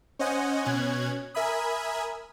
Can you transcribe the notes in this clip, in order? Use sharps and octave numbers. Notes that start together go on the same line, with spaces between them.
C#4 C5 D#5 F#5 G#5
B2 C#4 F#6 G#6
A#4 E5 G#5 B5 D#6